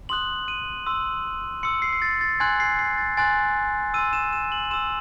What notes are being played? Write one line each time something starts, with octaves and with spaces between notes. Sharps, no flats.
C6 D#6 F#6 F#7
D#7
C6 E6
C6 E6 C#7
C7
C7
A6
A6
G#5 C6 F#6 G#6
C7
C7
A6
G#5 C6 F#6 A6
C6 E6 D#7
E7
E7
F#7
C6 E6 E7